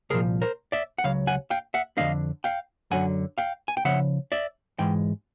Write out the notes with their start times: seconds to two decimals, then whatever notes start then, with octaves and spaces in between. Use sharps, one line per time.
0.10 C2 A#2 F3 G#4 A#4
0.42 A#4 C5
0.72 D5 E5
0.98 F#5
1.04 C#2 C#3 F#3 F5
1.27 F#5 G#5
1.50 F5 G5
1.74 E5 F#5
1.97 F2 D3 F3 A#3 D4 D#5 F5
2.44 F5 G5
2.91 F#2 D3 F#3 F#5 G#5
3.38 F5 G5
3.68 G#5
3.77 G5
3.85 C#3 F3 E5 F#5
4.32 D5 E5
4.79 G#2 E3 G#3 G5